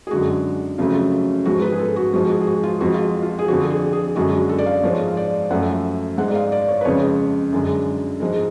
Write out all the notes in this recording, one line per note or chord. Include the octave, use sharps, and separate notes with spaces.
G#4
F#2 D3 G#3 F#4
F2 C#3 F#3 A3 F4
G#2 F3 G#3 F#4
B4
G#4
A4
F#4
G#2 F3 G#3 F#4
F#4
G#4
G#4
F#4
F4
F2 F3 G#3 F#4
F4
F4
G#4
F2 D3 F3 F#4
A4
G#4
G#4
F#2 D3 G#3 F#4
F#4
A4
D5
F5
G#2 F3 G#3 C#5
F5
D5
F#2 F3 A3 F#5
G#2 G#3 F#5
D5
F5
D5
C#5
B4
F2 C#3 G#3 C#5
F#2 D3 G#3
G#2 F3 G#3